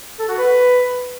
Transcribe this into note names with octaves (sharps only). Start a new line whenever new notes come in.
A4
F#4
B4